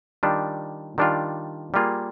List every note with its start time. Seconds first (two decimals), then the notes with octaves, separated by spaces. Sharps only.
0.23 D#3 G3 D4 F4
0.98 D#3 G3 D4 F4
1.74 G3 A#3 F4 G#4